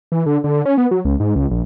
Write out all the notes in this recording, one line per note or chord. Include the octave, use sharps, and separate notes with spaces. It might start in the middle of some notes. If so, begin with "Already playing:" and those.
E3
D3
D3
C#4
B3
F#3
C#2
G#2
C#2
A#1